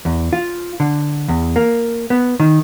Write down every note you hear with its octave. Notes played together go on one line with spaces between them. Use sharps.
E2
F4
D3
E2
A#3
B3
D#3